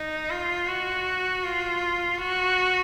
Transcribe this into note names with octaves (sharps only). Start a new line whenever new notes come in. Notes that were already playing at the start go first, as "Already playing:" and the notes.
Already playing: D#4
F4
F#4
F4
F#4